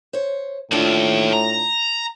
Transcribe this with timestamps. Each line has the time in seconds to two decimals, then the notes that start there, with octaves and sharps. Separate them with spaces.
0.13 C5 C#5
0.72 D#2 A2 D4 F4
1.33 A#5